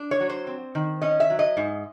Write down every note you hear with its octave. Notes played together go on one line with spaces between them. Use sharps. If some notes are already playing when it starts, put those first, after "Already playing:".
Already playing: D4
C#5
F#3
C5
C4
D#3
C#4 D#5
E5
F#3
D#5
G#2